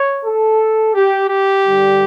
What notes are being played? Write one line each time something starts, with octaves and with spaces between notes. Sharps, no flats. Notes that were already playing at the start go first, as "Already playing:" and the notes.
Already playing: C#5
A4
G4
G4
G2 D3 G3